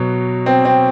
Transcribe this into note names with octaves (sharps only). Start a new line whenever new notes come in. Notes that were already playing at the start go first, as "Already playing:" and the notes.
Already playing: B2 F#3
C4
C4